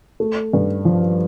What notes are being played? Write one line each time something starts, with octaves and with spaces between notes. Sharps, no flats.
A3
G2
F3